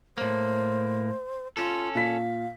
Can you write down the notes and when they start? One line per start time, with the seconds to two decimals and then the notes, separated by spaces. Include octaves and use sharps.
0.18 A2 A#3 C5
1.57 C#4 F4 A4
1.95 A#2 F5 B6